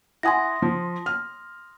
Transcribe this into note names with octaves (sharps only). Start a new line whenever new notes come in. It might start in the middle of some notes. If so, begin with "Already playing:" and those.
E4 F#5 G#5 C6 D#6 A#6
F3
F6